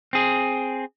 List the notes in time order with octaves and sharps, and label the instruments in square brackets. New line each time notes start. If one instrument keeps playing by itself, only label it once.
[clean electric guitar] C4 G#4